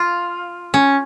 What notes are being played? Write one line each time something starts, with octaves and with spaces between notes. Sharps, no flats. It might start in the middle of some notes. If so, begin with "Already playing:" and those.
Already playing: F4
C#4